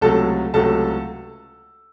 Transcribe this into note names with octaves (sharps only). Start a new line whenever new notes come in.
C#2 C3 F#3 A3 A4 A5
C#2 C3 F#3 A3 A4 A5